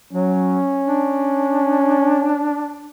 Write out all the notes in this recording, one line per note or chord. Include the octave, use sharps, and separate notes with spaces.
F#3 C#4
D4